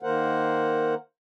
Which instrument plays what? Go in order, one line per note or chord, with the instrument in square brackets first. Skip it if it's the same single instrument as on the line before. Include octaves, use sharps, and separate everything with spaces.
[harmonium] D#3 A#3 A#4 C5 F#5